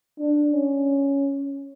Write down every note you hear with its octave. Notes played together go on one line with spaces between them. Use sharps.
D4
C#4